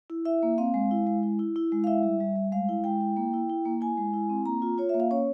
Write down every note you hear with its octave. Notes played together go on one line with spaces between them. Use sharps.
E4
E4 E5
A#3
C4 F5
G#3
E4
G#3
E4
E4
E4
G#3
F5
E4 E5
G3
G3
G3
G#3 F5
E4
G#3 G5
E4
A#3
E4
E4
A#3
E4 G#5
G#3
E4
C4
A#3 A#5
F4
F4 C#5
E5
A#3
F5
C#4 C#5